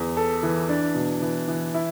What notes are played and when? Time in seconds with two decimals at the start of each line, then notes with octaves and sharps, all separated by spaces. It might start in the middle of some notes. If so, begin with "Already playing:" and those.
Already playing: E2
0.17 A4
0.43 E3
0.69 D4
0.95 B2
1.22 E3
1.48 E3
1.74 E4